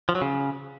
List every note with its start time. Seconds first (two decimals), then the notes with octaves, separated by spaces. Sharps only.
0.09 F3
0.15 F#3
0.22 C#3